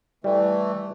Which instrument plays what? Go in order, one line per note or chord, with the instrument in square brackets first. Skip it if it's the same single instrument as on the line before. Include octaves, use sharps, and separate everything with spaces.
[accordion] E3 A3 [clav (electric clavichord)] G3